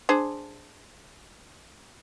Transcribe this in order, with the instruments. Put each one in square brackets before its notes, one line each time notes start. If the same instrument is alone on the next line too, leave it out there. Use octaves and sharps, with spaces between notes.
[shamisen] D4 G#4 C5